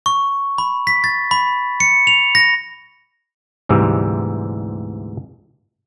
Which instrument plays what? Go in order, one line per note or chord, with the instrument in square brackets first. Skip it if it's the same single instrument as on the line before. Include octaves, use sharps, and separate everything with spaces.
[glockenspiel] C#6
B5
B6
A6
B5
C#7
F7
A#6
[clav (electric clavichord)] D2 G#2 C3 E3 G3